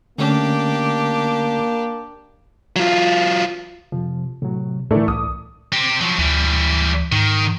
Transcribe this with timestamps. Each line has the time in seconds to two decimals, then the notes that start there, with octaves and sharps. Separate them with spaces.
0.18 D3 A3 A#3 C#4 D4 G4
2.76 F#3 F4
3.92 F2 C3 F3
4.42 A2 C3 F#3
4.91 A2 E3 A3 A#4 D5
5.08 C2 D6 D#6
5.72 C4 G4
6.01 F3 F#3
6.19 D2 E3 G3
7.12 G#2 D#3